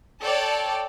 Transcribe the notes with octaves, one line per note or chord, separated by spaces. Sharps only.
A4 C#5 D5 G5 A5